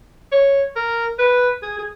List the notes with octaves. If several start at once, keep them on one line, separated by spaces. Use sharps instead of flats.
C#5
A#4
B4
G#4
G#4